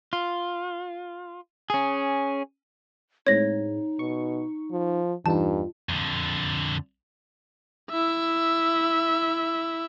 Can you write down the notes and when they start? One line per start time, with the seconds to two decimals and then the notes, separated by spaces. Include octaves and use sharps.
0.13 F4
1.70 C#4 G#4
3.27 A2 G#3 C4 D#4 C#5 A#6
3.99 B2 C#6
4.72 F3
5.26 E2 G2 D#4 F4 A5
5.89 F2 D3
7.91 E4 E5